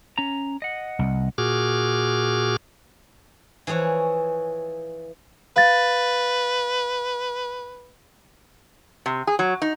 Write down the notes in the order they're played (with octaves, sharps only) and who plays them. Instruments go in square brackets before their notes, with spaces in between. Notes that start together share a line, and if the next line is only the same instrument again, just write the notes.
[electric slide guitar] C#4 A#5
D#5 F#5
[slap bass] C2
[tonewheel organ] A#2 F#4 G#4 D6 F6
[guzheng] E3 F3 G#4 C#5
[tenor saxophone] B4 [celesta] F5 A6
[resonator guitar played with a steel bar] C3
G#4
F#3
D#4